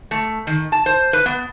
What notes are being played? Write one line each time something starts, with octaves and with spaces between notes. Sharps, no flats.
A3
D#3
A5
C5
B4
B3